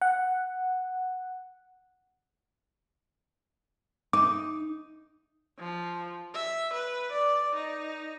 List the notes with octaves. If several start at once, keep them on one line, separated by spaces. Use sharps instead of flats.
F#5
D#4 D6
F3
E5
B4
D5
D#4